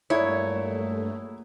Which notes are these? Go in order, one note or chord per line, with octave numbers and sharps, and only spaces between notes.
G2 A#2 F#3 A3 E4 G#4 C#5